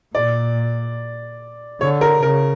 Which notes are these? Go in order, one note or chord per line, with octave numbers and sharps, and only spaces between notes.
A#2 D5
D3 C#5
A#4
C#3 A#4